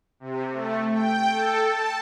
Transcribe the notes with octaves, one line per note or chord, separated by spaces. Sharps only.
C3
A3
G5
A4
A5